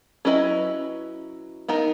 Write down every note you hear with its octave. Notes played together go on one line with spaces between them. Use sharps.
F#3 C#4 E4 B4 D#5
B3 D#4 A#4